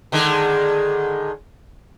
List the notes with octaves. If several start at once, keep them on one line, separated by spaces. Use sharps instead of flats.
D3 D#3 G#3